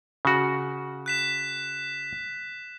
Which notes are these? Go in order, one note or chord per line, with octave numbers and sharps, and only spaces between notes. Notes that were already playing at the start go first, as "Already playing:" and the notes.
C#3 F#4
F#6 B6 E7